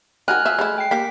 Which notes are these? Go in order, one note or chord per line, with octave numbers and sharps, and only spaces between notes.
D#3 F#4 A#4 G#5 F6 F#6
F3 E5
G#3 A3 E4
G5 C7
A#3 G4 A#4 B6